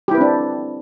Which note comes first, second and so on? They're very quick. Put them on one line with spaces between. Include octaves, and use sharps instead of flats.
G4 E4 B4 C4 D4